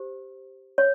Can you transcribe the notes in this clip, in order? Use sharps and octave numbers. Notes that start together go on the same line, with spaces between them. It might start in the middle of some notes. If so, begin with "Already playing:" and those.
Already playing: G4 C5
C#5